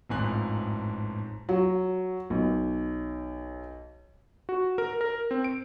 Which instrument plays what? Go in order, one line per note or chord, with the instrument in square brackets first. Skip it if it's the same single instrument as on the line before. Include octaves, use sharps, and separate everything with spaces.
[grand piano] A1 F2 G#2 G#5 F#6
[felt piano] F#3
B1
[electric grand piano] F#4
A#4
A#4
C4
D7